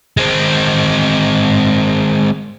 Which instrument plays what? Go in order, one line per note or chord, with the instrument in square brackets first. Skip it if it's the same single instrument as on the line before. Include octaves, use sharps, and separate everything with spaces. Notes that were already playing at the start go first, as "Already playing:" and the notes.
[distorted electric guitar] G#3 C4